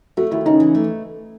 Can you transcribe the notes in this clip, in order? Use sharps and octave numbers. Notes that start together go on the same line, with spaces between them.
A3 F#4
D#2 E4
C#3 D#4
E3
A3